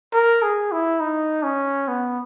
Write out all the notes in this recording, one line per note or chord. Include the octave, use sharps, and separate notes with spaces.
A#4
G#4
E4
D#4
C#4
B3